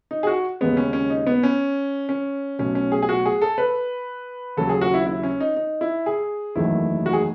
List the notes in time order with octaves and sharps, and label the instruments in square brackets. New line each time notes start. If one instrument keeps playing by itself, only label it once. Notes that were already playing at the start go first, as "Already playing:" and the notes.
[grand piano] D#4
G#4
F#4
D#2 C#3 G#3 B3
C#4
C#4
D#4
B3
C#4
C#4
B1 B2 A3 C#4
C#4
G#4
G#4
F#4
G#4
A4
B4
D#2 C#3 F#3 A4
G#4
F#4
E4
E4
C#4
D#4
D#4
E4
G#4
F#1 E2 D#3 F#3 A3 E4
F#4
G#4